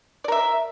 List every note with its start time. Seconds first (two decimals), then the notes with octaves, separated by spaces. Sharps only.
0.24 D5
0.28 A#4
0.32 E5